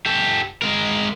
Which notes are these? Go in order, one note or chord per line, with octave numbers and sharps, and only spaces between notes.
G4 A4
G#3 A#4